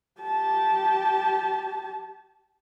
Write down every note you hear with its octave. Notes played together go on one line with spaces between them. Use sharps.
G4 A5